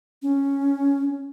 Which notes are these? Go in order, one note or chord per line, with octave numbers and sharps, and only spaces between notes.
C#4